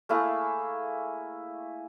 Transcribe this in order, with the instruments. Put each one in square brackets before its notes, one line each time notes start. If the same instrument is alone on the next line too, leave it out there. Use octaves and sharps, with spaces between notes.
[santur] A3 A#3 E4 G#4